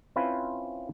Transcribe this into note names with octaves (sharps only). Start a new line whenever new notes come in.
C4 C#4 E4 F4 B4 C5